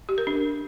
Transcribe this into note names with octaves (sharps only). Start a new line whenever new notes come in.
G4
A#4
D4